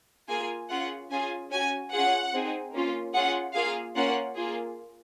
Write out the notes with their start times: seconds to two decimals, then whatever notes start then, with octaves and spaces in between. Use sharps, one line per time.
0.29 A#3 F4 G#4 G#5
0.70 C#4 F4 G#4 F#5
1.10 C#4 F4 G#4 G#5
1.51 C#4 F#4 G#5
1.92 C#4 F4 G#4 F#5
2.34 C4 D#4 G#4
2.74 A#3 C#4 F4
3.14 C#4 F4 G#4 F#5
3.55 A#3 F4 G#4 F5
3.96 A#3 C#4 F4 F#5
4.36 A#3 F4 G#4